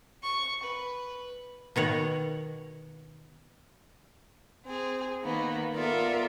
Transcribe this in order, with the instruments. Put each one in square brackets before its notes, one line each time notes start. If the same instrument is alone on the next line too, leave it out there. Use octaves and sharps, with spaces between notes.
[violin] C#6
B4
[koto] B2 D#3 C#5 F#5
[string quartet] C4 G#4
D#3 A#3 B3
B3 F4 A4 A#4 D5 E5